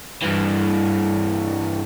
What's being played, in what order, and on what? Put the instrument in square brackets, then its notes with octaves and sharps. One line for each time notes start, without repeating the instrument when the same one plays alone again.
[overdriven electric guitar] G2 E3